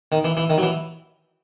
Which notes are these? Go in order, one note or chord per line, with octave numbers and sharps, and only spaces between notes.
D#3
E3
E3
D#3
F#3
E3